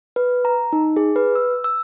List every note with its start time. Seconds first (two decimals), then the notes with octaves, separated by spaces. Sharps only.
0.16 B4
0.45 A#5
0.73 D#4
0.97 G#4
1.16 B4
1.35 E6
1.64 E6